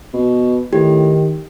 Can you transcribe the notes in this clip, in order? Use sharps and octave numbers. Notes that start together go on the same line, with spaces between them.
B2
A2 D#3 G4